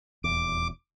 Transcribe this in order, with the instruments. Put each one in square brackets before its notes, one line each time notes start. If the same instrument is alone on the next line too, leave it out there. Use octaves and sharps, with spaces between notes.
[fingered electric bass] D#1 E2 [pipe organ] D6